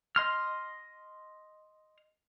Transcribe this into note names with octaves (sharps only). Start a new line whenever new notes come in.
D#5 C6 F6